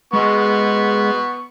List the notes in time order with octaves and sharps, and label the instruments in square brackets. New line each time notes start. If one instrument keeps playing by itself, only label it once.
[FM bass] G#3 [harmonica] B3 C#6